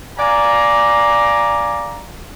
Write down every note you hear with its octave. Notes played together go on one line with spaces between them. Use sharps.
D5 F5 G#5 A#5